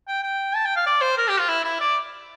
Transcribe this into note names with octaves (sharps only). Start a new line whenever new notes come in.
G5
G5
A5
G5
F5
D5
C5
A#4
G4
F4
E4
E4
D5